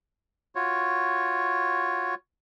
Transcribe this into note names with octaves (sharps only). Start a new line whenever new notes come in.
F4 F#4 C#5